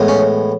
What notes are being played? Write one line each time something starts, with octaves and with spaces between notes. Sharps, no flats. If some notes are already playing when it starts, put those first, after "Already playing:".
Already playing: A2 E3 G#3 B3
C#4